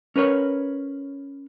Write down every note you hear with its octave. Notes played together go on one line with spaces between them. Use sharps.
C#4 A#4 B4 C#5